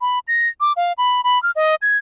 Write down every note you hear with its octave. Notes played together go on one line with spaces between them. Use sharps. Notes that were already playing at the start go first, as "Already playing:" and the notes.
B5
A#6
D6
F5
B5
B5
F6
D#5
G#6